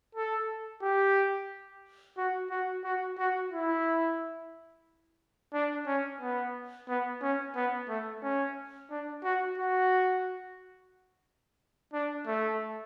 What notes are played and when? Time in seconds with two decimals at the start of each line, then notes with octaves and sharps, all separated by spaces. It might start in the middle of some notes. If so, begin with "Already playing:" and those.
0.15 A4
0.82 G4
2.17 F#4
2.50 F#4
2.84 F#4
3.18 F#4
3.52 E4
5.54 D4
5.87 C#4
6.21 B3
6.88 B3
7.22 C#4
7.56 B3
7.89 A3
8.23 C#4
8.90 D4
9.24 F#4
9.58 F#4
11.93 D4
12.27 A3